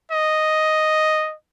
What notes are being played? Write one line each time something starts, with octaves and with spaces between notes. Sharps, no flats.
D#5